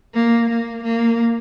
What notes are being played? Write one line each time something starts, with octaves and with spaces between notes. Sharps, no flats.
A#3
A#3
A#3